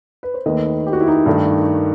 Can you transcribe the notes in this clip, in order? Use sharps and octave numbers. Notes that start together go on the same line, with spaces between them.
B4
C5
D#2 D#3 A3 B4 D#5
G4
F#4
E4
D#4 F#4
G2 D#3 A3